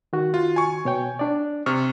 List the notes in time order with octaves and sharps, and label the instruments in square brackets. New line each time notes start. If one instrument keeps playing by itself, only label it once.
[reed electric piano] D#3 F#4
[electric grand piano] F4
G#5 C#6
[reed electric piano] B2 C#5 G5
D4 D5
[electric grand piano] C3 F6 [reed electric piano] C#6